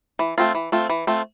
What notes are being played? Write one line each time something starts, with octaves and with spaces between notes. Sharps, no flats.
E3
A3 C4 F4
E3
A3 C4 F4
E3
A3 C4 F4